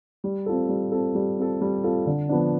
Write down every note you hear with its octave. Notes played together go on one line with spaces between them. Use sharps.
G3
C4 F4 A4
G3
C4 F4 A4
G3
C4 F4 A4
G3
C4 F4 A4
D3
F3 B3 D4